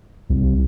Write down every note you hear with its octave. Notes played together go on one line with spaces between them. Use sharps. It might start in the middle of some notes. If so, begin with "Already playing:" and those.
C2